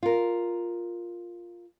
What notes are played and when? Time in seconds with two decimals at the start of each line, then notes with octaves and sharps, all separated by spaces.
0.03 F4 A#4